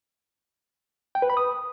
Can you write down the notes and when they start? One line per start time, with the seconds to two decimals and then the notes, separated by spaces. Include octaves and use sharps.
1.15 G5
1.22 B4
1.30 B5
1.37 D#6